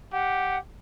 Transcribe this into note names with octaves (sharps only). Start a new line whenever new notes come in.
G4 F#5